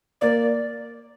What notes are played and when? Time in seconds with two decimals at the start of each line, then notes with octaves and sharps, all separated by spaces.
0.21 A#3 D5